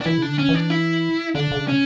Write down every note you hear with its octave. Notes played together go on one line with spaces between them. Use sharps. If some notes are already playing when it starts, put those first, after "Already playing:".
D4
E3 E4
C#3
D3 D4
C#4
E3
D4
E4
D3 D4
D3
C#3
C#4